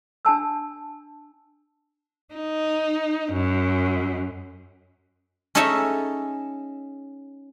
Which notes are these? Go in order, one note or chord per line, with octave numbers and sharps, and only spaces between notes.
D4 G#5 A5 E6
D#4
F#2
C#4 D#4 G#4 A4 C#5 E5